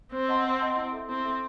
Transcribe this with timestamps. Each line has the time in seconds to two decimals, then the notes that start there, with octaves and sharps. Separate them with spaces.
0.12 C4 C5
0.28 D#5 F#5 A5 C6
0.45 C5
0.61 D#5 F#5 A5 C6
0.77 E4
0.93 A4 E5
1.09 C4 E4
1.25 A4 E5